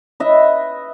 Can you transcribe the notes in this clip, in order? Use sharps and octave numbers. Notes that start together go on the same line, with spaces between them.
B4 D#5 E5